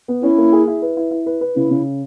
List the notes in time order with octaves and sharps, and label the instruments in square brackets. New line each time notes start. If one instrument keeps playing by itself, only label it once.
[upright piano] B3
[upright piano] C#4 [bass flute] E4
[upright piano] A#3
G#4
E4
B4
E4
E4
B4
B4
[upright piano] C#3 [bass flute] E4
[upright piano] C#3